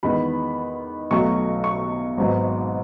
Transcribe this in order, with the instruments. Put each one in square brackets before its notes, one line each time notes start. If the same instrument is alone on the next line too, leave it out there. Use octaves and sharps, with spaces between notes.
[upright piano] E2 D#3 G#3 B3 B5
B1 B2 F#3 A3 C#6
C#6
G#1 G#2 F#3 B3